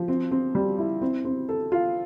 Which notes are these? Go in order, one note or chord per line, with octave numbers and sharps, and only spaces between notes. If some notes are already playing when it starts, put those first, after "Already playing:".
Already playing: F3
C4
C4
G3
E4
C4
C4
A4
F4